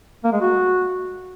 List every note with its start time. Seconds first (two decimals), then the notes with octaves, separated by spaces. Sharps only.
0.24 A#3
0.33 G#3
0.41 F#4